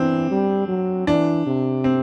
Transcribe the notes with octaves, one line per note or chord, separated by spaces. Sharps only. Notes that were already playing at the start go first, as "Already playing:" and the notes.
Already playing: E3 C4 D4
G3
F#3
E3 D4
C3
C4